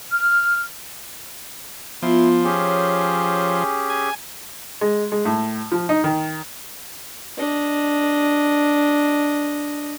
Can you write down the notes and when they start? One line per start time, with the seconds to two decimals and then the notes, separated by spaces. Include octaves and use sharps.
0.11 F6
2.02 F3 B3 E4 F4 C6
2.45 C#4 G4 G#4 C#5
3.90 G#5
4.81 G#3
5.12 G#3
5.25 A2
5.72 F3
5.89 D#4
6.04 D#3
7.37 D4 D#5